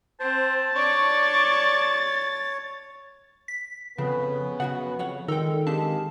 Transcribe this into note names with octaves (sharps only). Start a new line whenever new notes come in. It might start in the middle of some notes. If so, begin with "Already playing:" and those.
C4 C5 A5
D4 C#5 D5 C#6 A6
B6
F2 C#3 B3 C#4 B4
F#2 C#3 F#4 F#5
F2 C#5 F#5
A#2 D#3 G#3 A4 A#4 G5
G#3 C4 D4 G4 G#4 F5 A5